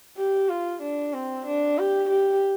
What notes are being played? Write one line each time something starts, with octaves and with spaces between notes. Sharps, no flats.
G4
F4
D4
C4
D4
G4
G4